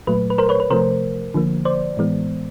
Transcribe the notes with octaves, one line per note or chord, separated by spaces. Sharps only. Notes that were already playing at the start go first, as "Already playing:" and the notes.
A#2 F#3 A3 B4
B4
A#4 C5
B4 C#5
B4
C3 F3 A3 A#4 C5
D3 F3 A#3
C5 D5
A2 E3 G#3 B3